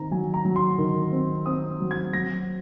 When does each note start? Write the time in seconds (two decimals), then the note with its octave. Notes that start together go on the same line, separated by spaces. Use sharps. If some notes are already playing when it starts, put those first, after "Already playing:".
Already playing: D#3 C4 A#5
0.11 F#3 G#5
0.34 A#5
0.45 F#3
0.56 C6
0.78 D#3
1.12 C4
1.46 C4 D#6
1.80 F#3
1.91 G#6
2.13 F#3 A#6